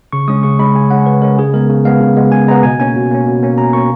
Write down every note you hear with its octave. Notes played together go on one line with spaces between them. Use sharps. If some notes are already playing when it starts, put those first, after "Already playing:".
C#3 C#6
G#3 C#4 D#6
C#3 C#6
G#3 C#4 B5
C#3 G#5
G#3 C#4 F#5
C#3 B4
G#3 C#4 A#4
C#3 G#4
G#3 B3 A#4
C#3
G#3 B3 F5
C#3
G#3 B3
C#3 G#5
G#3 B3 A#5
B2 G#5
A#3 C#4 G#5
B2
A#3 C#4
B2
A#3 C#4
B2 A#5
A#3 C#4 C#6